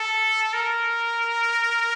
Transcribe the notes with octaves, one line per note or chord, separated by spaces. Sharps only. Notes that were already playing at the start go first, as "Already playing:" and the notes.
Already playing: A4
A#4